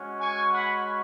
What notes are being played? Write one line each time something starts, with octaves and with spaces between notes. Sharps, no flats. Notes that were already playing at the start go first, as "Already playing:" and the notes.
Already playing: G#3 C#4 F#4
G#5 C#6
F#5 B5